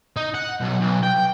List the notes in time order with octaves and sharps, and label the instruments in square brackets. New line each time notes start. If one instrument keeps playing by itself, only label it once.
[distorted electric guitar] D#4
F#5
B1
B1
G5